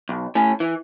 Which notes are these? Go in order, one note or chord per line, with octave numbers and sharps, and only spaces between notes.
B1
A2 C#4
E3